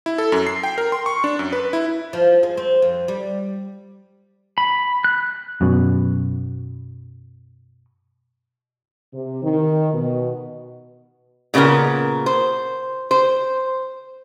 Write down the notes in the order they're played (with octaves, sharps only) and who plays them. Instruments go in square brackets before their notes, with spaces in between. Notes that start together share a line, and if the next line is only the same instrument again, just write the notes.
[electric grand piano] E4
A4
F#2
C7
G5
A#4
C6
C#6
D4
F#2
B4
E4
[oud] F3
G#3
C4
F2
G3
[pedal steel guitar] B5
F#6
[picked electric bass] F#2 B2
[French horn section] C3
D#3
B2
[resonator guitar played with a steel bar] A#2 C#3 B3 F4 A#4
C5
C5